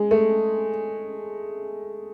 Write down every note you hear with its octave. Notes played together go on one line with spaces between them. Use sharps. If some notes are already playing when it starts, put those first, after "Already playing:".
Already playing: G#3
A3